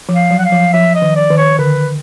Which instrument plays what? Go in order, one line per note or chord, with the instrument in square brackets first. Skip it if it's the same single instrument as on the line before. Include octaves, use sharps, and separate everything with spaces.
[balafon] F3
[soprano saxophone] F5
[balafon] F#3
[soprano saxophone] F#5
F5
[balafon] F3
[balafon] F3 [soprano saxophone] E5
[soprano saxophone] D#5
[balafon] D#3
[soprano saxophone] D5
[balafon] D#3
[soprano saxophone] C#5
[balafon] D3 [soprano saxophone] B4